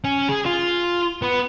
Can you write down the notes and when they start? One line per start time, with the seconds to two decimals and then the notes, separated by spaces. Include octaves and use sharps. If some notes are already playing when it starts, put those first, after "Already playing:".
0.04 C#4
0.29 G#4
0.46 F4
1.22 B3